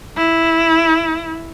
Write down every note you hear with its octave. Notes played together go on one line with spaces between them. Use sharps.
E4